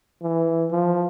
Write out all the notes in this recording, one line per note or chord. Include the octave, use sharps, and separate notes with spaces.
E3
F3